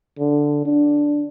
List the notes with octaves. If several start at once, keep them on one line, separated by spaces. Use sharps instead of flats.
D3
D4